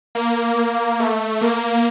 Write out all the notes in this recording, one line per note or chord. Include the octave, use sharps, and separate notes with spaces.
A#3
A3
A#3